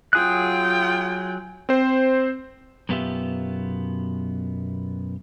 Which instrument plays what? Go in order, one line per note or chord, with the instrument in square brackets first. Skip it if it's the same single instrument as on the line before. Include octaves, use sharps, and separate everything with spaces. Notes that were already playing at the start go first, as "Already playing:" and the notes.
[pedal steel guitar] F#3 G#4 F#6 [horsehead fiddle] F4 G5
[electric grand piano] C4 C5
[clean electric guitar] F#2 B2 B3 F4 G4 E5